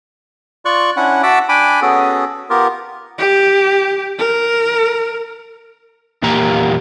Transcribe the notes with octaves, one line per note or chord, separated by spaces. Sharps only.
F4 D5 C#6 F#6
C#4 D4 E4 F#5
F#4 E5 F#5 A5 D6 E6
D4 G5 G#5 B5 D6
B3 C#4 F#4 G#4 A4
B3 F4 G4 A#4
G4
A#4
E2 A#2 A#3 G4 A#5